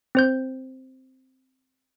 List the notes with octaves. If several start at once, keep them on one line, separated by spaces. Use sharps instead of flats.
C4 C5 G6